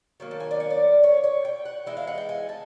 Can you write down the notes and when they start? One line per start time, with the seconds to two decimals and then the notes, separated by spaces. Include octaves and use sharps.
0.20 D#3 F#3 A#3
0.31 A5
0.40 G#5
0.51 D5
0.60 C#5
0.70 D5
1.03 C#5
1.24 C#5
1.45 G5
1.65 F#5
1.86 E3 G#3 D#4 E5
1.97 F5
2.07 F#5
2.18 G5
2.29 G#5
2.49 A5